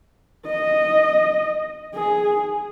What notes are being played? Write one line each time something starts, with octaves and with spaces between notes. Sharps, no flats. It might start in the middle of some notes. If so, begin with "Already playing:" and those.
D#5
G#4